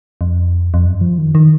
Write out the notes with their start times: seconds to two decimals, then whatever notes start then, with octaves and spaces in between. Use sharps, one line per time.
0.21 F2
0.74 F2
0.86 F#2
1.01 F3
1.18 D#3
1.35 D#3